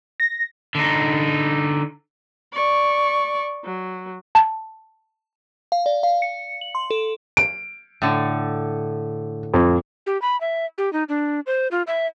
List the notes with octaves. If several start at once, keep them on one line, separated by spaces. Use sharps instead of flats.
A#6
D3 D#4
D5 C#6
F#3
A5
F5
D5
F5
C#7
F#7
C6
A4
D7
A2 D3
F2
G4
B5
E5
G4
D#4
D4
C5
F4
E5